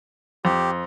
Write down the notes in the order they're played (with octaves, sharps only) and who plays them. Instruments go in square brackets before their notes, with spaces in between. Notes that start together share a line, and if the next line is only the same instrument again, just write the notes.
[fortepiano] F2 [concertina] G4